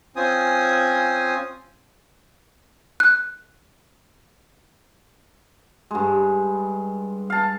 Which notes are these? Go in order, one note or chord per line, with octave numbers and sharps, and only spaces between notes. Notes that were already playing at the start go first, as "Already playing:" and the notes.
C4 C#4 F4 C5 G#5 D#6
F#6
G2 G#3
F5 A5